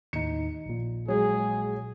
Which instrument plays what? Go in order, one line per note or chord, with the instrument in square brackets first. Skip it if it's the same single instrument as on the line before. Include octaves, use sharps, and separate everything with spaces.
[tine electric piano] D#2 A2 D#4 [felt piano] C#7
[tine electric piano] A#1 A#2
[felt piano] F#3 G#3 [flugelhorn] G#4